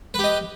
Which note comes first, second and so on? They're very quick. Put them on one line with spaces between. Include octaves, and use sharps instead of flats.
B4 G4 D#5